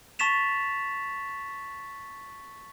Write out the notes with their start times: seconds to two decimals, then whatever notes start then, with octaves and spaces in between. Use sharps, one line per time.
0.19 A5 C#6 A6 B6 E7 F7